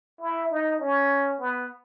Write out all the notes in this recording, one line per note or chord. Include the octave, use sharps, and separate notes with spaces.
E4
D#4
C#4
B3